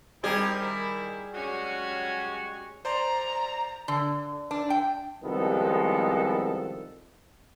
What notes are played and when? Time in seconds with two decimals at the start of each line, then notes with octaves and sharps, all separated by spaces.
0.24 G3 C4 D#4 G4 G#4 A#4
0.59 D#3 E4
1.34 F#3 G#3 C#4 F#4 G#5
2.85 C5 D5 A#5 C6
3.88 D3
4.51 D4
4.70 G5
5.24 C2 D#3 F3 G#3 B3 A4